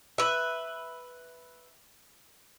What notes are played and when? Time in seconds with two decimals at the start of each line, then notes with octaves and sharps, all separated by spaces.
0.18 B4 E5